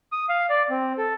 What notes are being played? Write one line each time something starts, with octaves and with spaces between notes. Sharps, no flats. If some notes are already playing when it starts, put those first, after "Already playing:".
D#6
F5
D5
C4
A4